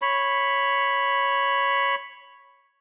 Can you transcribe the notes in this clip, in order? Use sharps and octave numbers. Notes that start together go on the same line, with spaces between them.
C#5 B5